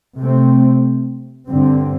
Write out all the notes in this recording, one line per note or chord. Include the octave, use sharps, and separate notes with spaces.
C3 A3 C4
G2 D3 C4